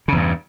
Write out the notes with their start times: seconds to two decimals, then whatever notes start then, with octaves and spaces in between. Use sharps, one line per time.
0.08 C#3
0.12 E2
0.17 G2